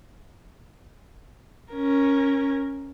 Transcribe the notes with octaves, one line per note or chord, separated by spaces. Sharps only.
C#4 A#4